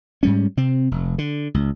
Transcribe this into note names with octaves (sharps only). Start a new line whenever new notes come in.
G#2 G3 C#4
C3 C4
F1
D3
C#2